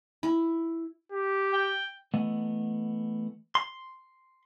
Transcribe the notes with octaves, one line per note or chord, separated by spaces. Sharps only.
E4
G4
G5
E3 A3 B3 D#5 F#5
C6